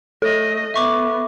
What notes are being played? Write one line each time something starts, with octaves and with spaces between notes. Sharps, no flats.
A3 A4 D#5
B3 E5 C#6 D6